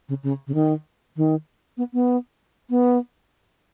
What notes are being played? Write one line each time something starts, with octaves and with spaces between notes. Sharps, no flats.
C#3
C#3
C#3
D#3
D#3
B3
B3
B3